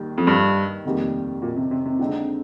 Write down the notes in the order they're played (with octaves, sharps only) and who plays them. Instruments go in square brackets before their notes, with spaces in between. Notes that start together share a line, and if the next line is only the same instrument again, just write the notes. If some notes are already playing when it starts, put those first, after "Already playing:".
Already playing: [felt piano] D#2 D#3 G3
[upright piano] F2
G2
[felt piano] F1 D#2 D#3 G3
[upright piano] A#2
C3
C3
C3
[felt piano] D3 G#3 C4 D#4